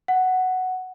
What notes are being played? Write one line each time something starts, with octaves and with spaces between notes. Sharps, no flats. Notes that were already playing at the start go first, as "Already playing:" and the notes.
F#5